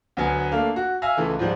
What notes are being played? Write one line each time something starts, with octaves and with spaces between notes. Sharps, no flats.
D2 F#3 B3 G#5
A3 A#3 D4 F5
F#4
E5 F5 G#5 E6 A#6
C#2 E3 A3
G#2 F3 G3